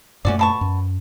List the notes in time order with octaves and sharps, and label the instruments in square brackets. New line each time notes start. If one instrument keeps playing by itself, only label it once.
[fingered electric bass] F#2 A#2 A3 [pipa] C#4 F#4 D5
[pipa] B2 A5 C#6
[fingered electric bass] F#2